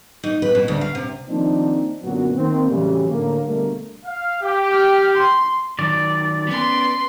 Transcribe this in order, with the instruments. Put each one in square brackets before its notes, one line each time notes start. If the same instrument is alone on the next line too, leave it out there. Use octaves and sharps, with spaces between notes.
[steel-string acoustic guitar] D#4
B4
B2
D2
F5
C3
[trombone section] D#3 F3 A#3 C4 D4 D#4
F#2 A#2 D3 F#3 B3 F#4
D#3 A#3 C4
A2 C#3 E3 F#3 G3
D2 A2 D3 A#3
B2 D3 G3 A3 A#3
[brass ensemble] F5
G4
[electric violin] G5 F6
C6
[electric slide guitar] D#3 F#3 [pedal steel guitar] D5
[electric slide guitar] B3 C#4 [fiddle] B4 C6